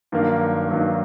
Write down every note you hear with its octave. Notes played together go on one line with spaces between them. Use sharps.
G2 D#3 F#3 A#3
G2 D#3 F#3 A#3